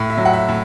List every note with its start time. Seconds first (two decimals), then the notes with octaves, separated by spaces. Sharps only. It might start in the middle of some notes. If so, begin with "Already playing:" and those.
Already playing: A2
0.10 E5
0.17 F#3
0.25 F#5
0.33 E5
0.49 A2